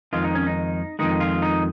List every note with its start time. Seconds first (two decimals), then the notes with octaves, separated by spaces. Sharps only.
0.13 F2 D#3 G#3 F4
0.24 D#4
0.35 C#4
0.47 D#4
0.99 F2 D#3 G#3 D#4
1.20 F4
1.42 D#4